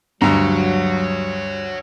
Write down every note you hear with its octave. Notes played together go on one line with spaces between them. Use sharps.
D2 G2 F#3 C#5 F#5 A#5